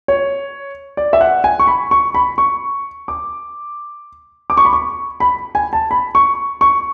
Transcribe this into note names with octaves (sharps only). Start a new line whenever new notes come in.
C#5
D5
E5
F#5
G#5
C#6
B5
C#6
B5
C#6
D6
D6
C#6
B5
C#6
B5
G#5
A5
B5
C#6
C#6